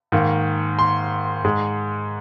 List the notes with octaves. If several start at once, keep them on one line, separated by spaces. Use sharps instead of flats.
G#2 D#3 A#3
C6
G#2 G#3